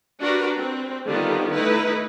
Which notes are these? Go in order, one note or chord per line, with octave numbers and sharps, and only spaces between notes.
D4 F#4 G4 A#4 B4
C4
D3 D#3 G3 B3 F4 G4
A3 D#4 E4 B4